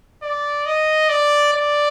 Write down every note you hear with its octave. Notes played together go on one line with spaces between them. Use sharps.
D5
D#5
D5
D5